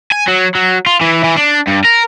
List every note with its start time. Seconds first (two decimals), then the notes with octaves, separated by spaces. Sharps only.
0.12 G#5
0.28 F#3
0.55 F#3
0.86 F4
1.01 E3
1.24 E3
1.36 D4
1.68 G2
1.85 A#4